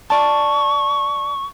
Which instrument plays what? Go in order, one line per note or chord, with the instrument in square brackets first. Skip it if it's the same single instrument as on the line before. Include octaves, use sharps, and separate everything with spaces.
[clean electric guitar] D5 A5 [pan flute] C#6